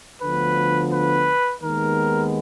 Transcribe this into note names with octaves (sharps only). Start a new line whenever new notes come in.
D2 D3 F3 B3 B4
B4
D#2 D#3 G#3 B3 A#4